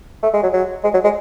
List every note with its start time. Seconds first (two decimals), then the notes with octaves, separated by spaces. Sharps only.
0.23 A3
0.34 G#3
0.43 F#3
0.53 F#3
0.84 G#3
0.94 F#3
1.04 G#3